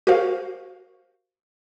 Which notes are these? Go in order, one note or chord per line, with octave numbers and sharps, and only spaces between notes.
F#4 G4 A#4 C5 F5